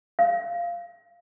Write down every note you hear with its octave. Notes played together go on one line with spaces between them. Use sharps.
F5